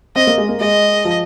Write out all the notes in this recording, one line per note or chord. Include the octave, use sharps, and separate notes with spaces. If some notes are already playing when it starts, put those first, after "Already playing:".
C4 D#5
A#3
G#3
A#3
G#3 D#5
F3